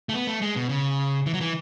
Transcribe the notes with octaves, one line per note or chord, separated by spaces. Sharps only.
A3
B3
A3
G#3
B2
C#3
E3
F#3
E3